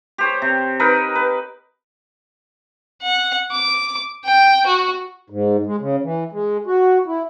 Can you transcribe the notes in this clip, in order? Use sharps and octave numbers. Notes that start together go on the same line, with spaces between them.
G4 C5 C#5
C3
D#4 A#4 B4
B4
F#5
D6
G5
F#4
G#2
G#3
C#3
E3
G#3
F#4
E4